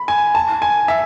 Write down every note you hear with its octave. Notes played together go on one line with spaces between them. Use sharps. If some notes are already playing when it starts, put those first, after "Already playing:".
Already playing: B5
G#5
A5
G#5
E5